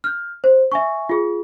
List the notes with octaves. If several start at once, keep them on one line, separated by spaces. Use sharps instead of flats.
F6 G6
C5
E5 G#5 C#6
F4 G#4